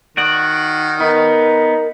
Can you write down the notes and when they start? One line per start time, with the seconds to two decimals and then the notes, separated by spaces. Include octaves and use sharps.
0.17 D#3 F#4 D5 F#5
1.00 B3 D#4 A#4